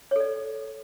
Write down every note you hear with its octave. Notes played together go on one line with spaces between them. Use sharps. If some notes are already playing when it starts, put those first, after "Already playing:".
A4 C#5 D5